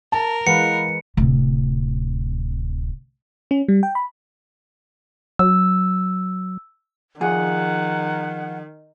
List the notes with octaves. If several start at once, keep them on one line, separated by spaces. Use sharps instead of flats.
A#4 A5
E3 G#3 B4 F5 F#5 C#7
D1 C3
C#4
G3
G5
B5
F#3 E6
D#3 F3 G#4 F#5